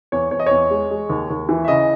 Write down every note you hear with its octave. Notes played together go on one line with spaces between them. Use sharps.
E2 C#5
E2 C#5
D#5
E2 C#5
G#3
G#3
D#2
D#2
E3
E5
C#3 D#5